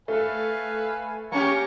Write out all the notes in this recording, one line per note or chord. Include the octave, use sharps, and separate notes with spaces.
A3 A4 B4 F5 G#5
A#3 C#4 G4 C#5 A#5 C#6